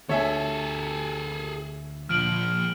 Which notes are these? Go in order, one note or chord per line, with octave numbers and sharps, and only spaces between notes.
D2 G#4 A4 C#5 E5 G#5
A#2 F3 F6 D7 F#7